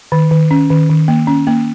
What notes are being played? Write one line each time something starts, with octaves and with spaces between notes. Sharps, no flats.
D#3
D#3
C#4
D#3
D#3
A#3
C#4
A#3